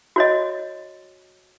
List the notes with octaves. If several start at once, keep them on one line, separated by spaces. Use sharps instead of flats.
F#4 C#5 D#5